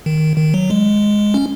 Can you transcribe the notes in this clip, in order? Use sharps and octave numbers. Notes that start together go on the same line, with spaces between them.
D#3
D#3
F#3
G#3
C#4